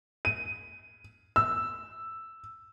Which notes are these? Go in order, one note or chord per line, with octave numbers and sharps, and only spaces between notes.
D#7
E6